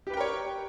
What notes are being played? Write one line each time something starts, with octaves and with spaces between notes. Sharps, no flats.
G4 A#4 B4 C#5 G5